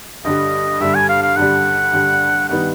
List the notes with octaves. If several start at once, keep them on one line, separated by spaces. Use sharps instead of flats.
G2 D3 G3 D#5
G2 D3 G3 E5
G#5
F5
F5
G2 D3 G3 F#5
G2 D3 G3
G2 D#3 G3 B3 D#4 F#5